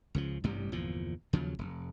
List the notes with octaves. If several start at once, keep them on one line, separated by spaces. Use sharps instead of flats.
C#2 C#3 F3
A1 G2 C3 G3
G1 E2 A#2 F3
D#2 C#3 F3 F#3
F1